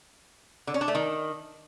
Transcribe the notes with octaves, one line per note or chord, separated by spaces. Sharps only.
D3
C#4
D4
A3
D#3